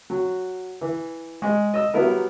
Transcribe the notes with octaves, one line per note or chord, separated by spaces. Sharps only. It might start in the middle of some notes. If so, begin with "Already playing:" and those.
F#3
E3
G#3
D#5 E6
F#3 G3 B3 E4 A#4